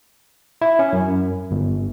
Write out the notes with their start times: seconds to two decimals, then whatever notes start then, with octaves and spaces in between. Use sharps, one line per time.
0.62 E4
0.79 C#4
0.93 F#2
1.51 G1